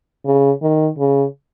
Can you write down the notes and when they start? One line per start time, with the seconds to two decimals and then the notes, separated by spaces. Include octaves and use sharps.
0.26 C#3
0.62 D#3
0.99 C#3